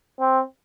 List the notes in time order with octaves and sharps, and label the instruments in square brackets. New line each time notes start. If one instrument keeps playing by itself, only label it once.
[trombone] C4